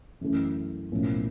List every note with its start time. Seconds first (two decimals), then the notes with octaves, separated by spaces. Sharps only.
0.21 F#2 C#3 E3 A3 C#4
0.91 B1 A2 F3 A#3 C#4